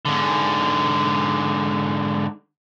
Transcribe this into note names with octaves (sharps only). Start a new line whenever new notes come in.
G#2 D3